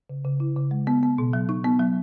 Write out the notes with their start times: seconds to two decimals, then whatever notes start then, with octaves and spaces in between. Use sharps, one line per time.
0.09 C#3
0.25 C#3
0.40 E4
0.57 C#3
0.71 G#3
0.87 B3
1.03 B3
1.18 B2
1.33 F#3
1.49 D#4
1.64 B3
1.80 F#3